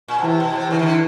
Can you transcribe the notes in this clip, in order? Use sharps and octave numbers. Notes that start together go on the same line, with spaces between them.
A#2
B2
C3 E3
B2
C3
C#3 E3
D#3
D3